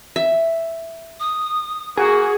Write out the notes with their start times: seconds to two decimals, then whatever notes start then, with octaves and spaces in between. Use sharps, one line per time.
0.16 E5
1.20 D#6
1.97 A#3 F#4 G#4